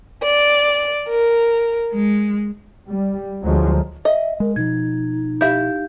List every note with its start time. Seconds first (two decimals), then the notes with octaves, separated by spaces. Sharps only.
0.23 D5
1.08 A#4
1.93 G#3
2.86 G3
3.42 D2 F3 F#3 G#3
4.05 D#5 E5
4.40 G#3 A#4
4.56 B2 F3 D#4 G#6
5.41 E4 G4 E5 F5 G6